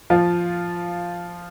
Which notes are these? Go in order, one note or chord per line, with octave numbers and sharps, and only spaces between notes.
F3 F4